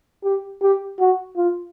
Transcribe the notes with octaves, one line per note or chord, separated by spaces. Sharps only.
G4
G4
F#4
F4